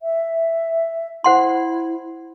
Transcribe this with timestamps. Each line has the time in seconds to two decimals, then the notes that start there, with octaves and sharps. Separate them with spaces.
0.01 E5
1.24 E4 C5 F#5 C6